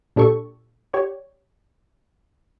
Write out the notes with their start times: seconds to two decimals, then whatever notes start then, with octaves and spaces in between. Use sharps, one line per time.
0.16 A#2 D4 G4 A4 C#6
0.93 G4 C#5 D5